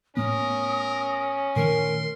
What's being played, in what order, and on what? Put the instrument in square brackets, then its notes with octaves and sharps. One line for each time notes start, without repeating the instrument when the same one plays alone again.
[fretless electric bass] A2 A3 B3 [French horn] C#4 [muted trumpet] A#4 [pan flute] D#6
[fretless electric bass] A#2 D#3 A3 [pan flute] A#4 [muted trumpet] C6